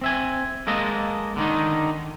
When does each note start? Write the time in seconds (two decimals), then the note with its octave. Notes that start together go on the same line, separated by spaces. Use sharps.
0.02 C4 E5 G#5
0.67 G#3 A#3 A4 D#5
1.36 D3 D#3 D#4